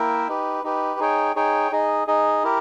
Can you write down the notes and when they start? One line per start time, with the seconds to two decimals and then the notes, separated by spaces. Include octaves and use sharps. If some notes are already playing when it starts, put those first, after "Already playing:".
Already playing: A#3 E4 A#4 E5 G5
0.28 D#4 G4 B4
0.64 D#4 G4 B4
1.00 D#4 G#4 C#5 G5
1.36 D#4 G#4 C#5 G5
1.71 D#4 G#4 D#5
2.07 D#4 G#4 D#5
2.43 E4 G4 A#4